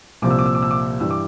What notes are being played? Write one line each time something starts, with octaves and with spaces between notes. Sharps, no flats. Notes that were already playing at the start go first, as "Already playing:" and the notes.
C2 A#2 F3 D6
E6
D6
E6
D6
E6
D6
G2 E3 E6
D6